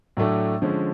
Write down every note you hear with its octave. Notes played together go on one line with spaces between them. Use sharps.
A2 F#3 A3 D4
D3 F3 G#3 C#4